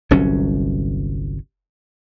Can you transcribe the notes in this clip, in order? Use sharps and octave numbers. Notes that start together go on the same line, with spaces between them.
G1 C2 F#3 C#4